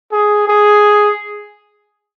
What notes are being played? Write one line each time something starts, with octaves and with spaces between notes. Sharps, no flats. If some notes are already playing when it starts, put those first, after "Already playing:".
G#4
G#4